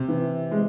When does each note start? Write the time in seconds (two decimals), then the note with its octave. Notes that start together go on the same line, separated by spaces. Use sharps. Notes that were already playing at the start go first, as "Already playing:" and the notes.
Already playing: C3
0.08 E3
0.51 G#3